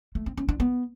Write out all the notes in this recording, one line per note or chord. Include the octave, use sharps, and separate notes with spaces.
A3
C4
C#4
D4
B3